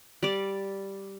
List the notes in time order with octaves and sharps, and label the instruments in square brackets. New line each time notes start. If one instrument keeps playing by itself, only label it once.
[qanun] G3 D5